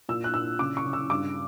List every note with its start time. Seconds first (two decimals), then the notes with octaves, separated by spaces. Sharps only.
0.09 A#2 E6
0.24 F#6
0.34 A#2 E6
0.59 C#3 D6
0.77 C#6
0.85 C#3
0.93 E6
1.10 G2 D6